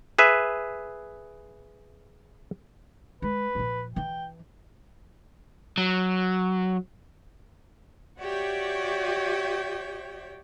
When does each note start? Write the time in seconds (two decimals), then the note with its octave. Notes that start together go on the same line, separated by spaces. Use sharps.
0.19 G#4 B4 E5
3.22 G#3 B4
3.55 A#2 F3
3.96 E3 D4 G5
5.78 F#3
8.20 F#4 G4 C#5 D5 E5 G5